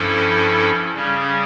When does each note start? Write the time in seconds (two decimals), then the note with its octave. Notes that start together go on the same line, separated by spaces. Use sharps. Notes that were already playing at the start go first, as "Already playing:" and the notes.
Already playing: G2 F3 C#4 E4 A4
0.94 C#3 G3 C#4